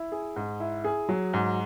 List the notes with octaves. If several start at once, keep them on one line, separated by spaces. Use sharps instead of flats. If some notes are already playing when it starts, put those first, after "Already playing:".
Already playing: E4
G#4
G#2
E4
G#4
F#3
G#2